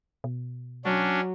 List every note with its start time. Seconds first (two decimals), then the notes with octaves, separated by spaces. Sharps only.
0.24 B2
0.85 F#3 C#4 D4